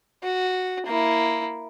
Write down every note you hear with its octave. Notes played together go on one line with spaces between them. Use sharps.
F#4
A#3 E4